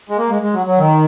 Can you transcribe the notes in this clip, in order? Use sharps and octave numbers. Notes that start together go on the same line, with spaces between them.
G#3
A#3
G#3
G#3
F#3
F#3
D#3